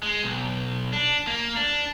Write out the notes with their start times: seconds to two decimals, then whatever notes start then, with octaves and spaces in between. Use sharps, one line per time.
0.03 G#3
0.24 B1
0.93 D4
1.27 A#3
1.57 D4